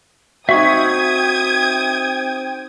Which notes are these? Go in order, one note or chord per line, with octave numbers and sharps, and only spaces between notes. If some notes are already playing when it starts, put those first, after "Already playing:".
C4 D#4 F#4 E5 G5 C#6 D#6 G#6